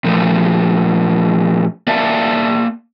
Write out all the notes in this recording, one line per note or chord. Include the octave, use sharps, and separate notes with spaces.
A#2 F3 A3
A#3 D5 E5 F5 A5